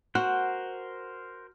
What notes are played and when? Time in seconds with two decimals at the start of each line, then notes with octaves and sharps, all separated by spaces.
0.15 F#4 A#4 C5 F#5